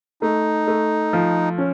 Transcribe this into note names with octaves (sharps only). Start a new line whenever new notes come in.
A3 D#4
A3
F3
C#4